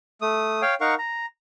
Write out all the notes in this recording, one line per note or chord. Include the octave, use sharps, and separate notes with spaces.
A3 D#6
C#5 F5 G5
D#4 A#4 F5 F#5 C#6
A#5